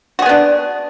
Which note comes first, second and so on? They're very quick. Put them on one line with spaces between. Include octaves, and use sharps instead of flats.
F#4 G#4 B3 D4